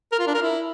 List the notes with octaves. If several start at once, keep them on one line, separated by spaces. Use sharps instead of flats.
A#4
F4
D4
A#4
E4